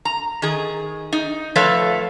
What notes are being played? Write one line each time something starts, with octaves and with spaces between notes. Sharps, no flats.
A#5
D#3 G#4
D#4
F3 A3 A4 B4 C#5 F5